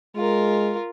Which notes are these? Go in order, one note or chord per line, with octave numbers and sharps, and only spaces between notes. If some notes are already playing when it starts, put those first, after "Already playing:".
G#3 F4 A#4